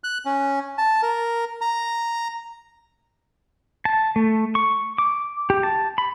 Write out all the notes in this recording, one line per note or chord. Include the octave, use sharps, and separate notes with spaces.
F#6
C#4
A5
A#4
A#5
A5
A3
C#6
D6
G4
A5
B5